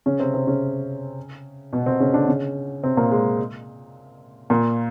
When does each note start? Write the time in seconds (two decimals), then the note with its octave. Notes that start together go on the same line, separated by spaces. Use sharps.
0.06 C#3 C#4
0.20 C3 C4
0.34 C3 C4
0.47 C#3 C#4
1.73 B2 B3
1.86 C3 C4
2.00 C#3 C#4
2.14 D3 D4
2.28 C#3 C#4
2.83 C3 C4
2.97 A#2 A#3
3.11 G#3
4.50 A#2 A#3